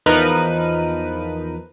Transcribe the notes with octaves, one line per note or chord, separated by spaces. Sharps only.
E2 F3 D#4 A#4 B4 D#7